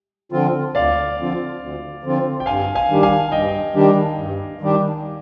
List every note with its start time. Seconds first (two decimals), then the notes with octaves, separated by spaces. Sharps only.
0.32 D3 F3 C4 F4
0.75 D2 D5 F5
1.18 D3 F3 C4 F4
1.61 D2
2.03 D3 F3 C4 F4
2.40 G5
2.46 G2 F5 G#5
2.75 F5 G#5
2.89 D#3 G3 D4 G4
3.03 F5 G#5
3.32 G2 D#5 G5
3.75 D#3 G3 D4 G4
4.18 G2
4.61 D#3 G3 D4 G4